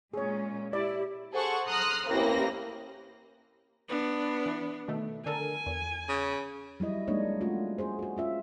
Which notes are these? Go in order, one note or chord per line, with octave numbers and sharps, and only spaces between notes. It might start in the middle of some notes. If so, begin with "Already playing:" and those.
A#2 G#3 C#4 G#4 C#5
E4 G4 D5
G#4 A4 C5 F#5 C#6
A#5 C6 D#6 F6 F#6 A#6
A1 A#3 C4 E4 G4 A#6
B3 D4
E3
B2 D#3 A3
D3 A4 A#4 G#5
E2
C#3
F#3 G3 E4 D#5
G#3 A#3 D4 D#4 C#5 D#5
A3 C#4 F4 F#4
F#4 G#4 C5
F#4 G#4
C#4 F4 E5